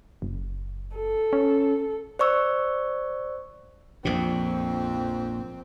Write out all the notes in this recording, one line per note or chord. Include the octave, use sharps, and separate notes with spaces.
F#1
A4
C#4
C5 D5 C#6 E6
A#1 F2 A#2 C4